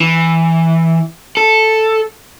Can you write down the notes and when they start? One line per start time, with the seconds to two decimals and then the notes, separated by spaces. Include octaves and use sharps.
0.01 E3
1.37 A4